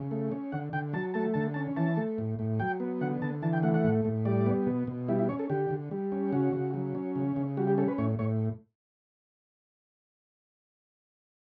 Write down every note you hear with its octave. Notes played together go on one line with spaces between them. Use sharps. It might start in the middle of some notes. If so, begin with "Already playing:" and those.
Already playing: C#3
A3
C#4
D3 F#5
D3 G5
F#3 A5
A3 A5
D3 A5
C#4 A5
E3 A5
A3
A2
A2
F#3 G5
B3
D3 F#5
D3 A5
E3 A5
G5
A3 F#5
F#5
A2
A2
G3 D5
B3
B2
B2
G3 E4
E4
C#4 C#5
A4
D3 G4
D3
G3
C#4
C#3 F#4
C#3
F#3
C#4
C#3
C#3
G3 F#4
G4
C#4 A4
B4
A2 C#5
A2 C#5